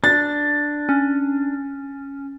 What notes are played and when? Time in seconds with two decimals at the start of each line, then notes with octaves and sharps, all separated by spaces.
0.04 D4 A6
0.89 C#4